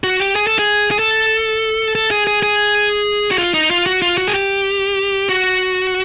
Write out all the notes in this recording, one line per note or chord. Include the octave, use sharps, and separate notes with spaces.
F#4
G4
G#4
A4
G#4
G#4
A4
A4
G#4
G#4
G#4
F#4
F4
D#4
F4
F#4
F4
F#4
G#4
G4
F#4